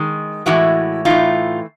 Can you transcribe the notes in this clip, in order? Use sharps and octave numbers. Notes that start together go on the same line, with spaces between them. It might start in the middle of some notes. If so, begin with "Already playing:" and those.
Already playing: D#3 G#3
A2 E3 G#3 E4 F#4
A2 E3 A3 D#4 F4